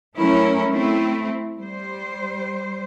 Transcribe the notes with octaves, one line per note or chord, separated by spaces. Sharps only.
F#3 A3 C#4 E4 A#4
A3 C4 E4
G3 C5